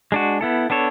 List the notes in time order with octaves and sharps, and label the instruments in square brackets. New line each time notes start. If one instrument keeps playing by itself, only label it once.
[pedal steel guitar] G#3 D4 F#4
B3 E4 A4
B3 D4 A4 C#5